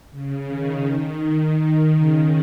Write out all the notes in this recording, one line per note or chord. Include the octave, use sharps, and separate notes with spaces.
C#3
D#3
D#3
C#3